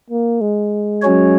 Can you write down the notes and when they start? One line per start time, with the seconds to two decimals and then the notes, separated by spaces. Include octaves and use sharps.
0.10 A#3
0.41 G#3
1.02 F#3 C#4 F#4 C#5